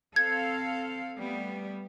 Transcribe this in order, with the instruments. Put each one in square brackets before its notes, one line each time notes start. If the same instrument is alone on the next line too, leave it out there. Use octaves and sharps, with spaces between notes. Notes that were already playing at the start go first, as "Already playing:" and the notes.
[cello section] C4 A4 F5 [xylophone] G#6
[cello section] G3 A3 B3